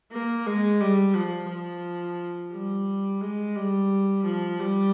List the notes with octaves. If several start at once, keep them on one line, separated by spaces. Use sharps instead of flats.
A#3
G#3
G3
F3
F3
G3
G#3
G3
F3
G3